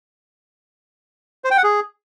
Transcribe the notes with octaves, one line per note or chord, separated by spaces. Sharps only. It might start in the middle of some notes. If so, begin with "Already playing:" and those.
C5
G5
F#5
G#4